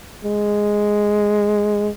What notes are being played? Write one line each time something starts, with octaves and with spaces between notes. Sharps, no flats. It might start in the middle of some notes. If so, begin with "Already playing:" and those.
G#3